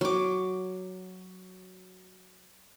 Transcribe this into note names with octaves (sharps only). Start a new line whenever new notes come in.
F#3 D6